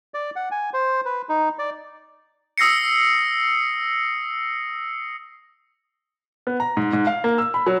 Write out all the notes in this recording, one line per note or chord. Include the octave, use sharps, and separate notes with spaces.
D5
F#5
G#5
C5
B4
D#4
D5
D#6 E6 A#6 C7 C#7
B3
A#5
G#2
G#2
F5
A#3
E6
B5
F#3